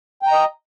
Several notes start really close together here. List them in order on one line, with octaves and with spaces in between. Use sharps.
G5 A#5 D#5